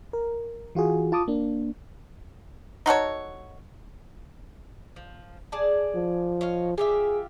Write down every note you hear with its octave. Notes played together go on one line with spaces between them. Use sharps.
A#4
E3 F4 F#4 G#4
F4 A5 D6 D#6
A#3 D4
D#4 F#4 A4 C#5
F3
G#4 D5 A5
F3
C#5 D#5 F5
F4 G4 G#4 E5